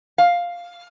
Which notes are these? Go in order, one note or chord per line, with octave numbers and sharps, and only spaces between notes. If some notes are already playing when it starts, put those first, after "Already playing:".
F5